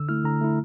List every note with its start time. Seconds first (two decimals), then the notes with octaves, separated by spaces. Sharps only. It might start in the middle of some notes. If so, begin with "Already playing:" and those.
Already playing: D3 E6
0.09 A3 E4 F6
0.24 D3 A#5
0.41 A3 E4